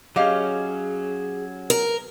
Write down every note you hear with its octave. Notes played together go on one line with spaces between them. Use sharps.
F#3 C#4 G4 G#4 D#5 F5
A#4